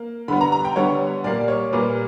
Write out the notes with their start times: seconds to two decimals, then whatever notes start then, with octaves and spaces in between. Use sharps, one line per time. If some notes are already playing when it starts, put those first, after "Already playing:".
Already playing: A#3
0.28 D3 G3 B3 B5
0.41 A#5
0.52 A#5
0.65 G5
0.76 D3 G3 B3 C#5
1.24 A#2 G3 A#3 D5
1.48 C#5
1.73 A#2 G3 A#3 B4